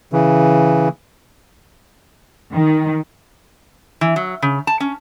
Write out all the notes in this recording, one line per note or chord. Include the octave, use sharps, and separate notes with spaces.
C#3 E3
D#3
E3
F#3
C#3
A5
C#4